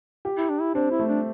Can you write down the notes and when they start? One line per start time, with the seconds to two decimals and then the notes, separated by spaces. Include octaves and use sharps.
0.25 G4
0.37 E4
0.50 D4
0.61 E4
0.75 C4 D4
0.91 E4
0.99 A3
1.08 D4